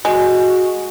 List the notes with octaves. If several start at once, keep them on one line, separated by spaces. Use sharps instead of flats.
G#3 F#4